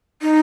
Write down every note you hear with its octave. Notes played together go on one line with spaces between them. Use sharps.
D#4